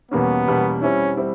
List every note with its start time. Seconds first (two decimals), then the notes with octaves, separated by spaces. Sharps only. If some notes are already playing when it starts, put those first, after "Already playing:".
0.11 E2 B2 G3 A#3 B3 C#4
0.47 E2 B2 G3 A#3 C#4
0.82 G3 C4 C#4 E4
1.17 G3 C4 E4